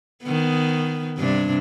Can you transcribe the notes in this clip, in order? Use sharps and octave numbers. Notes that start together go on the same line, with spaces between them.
D#3 B3
G2 C3 D4